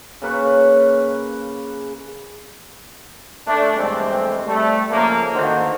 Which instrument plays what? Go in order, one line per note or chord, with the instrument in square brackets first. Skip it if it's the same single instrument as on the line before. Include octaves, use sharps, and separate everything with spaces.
[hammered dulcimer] C#3 A#3 B4 C#6
[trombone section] A3 D4
E2 G2 G#3 A3 C4
G3 A3
C#3 F3 A3 A#3
A1 D3 D#3 A#3 F#4 C5